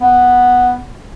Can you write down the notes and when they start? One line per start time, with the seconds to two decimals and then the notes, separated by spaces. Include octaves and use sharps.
0.01 B3